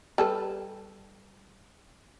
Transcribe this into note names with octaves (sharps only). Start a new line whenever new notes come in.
G3 A4 B4